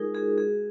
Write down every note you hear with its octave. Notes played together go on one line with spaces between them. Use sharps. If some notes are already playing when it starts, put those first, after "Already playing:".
Already playing: G#3 D#4 F4 G#4 A#4
F#4 G#4
G#3 G#4